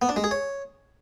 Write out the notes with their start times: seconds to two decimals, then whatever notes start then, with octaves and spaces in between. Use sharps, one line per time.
0.02 B3
0.09 D4
0.16 G#3
0.24 G#4
0.31 C#5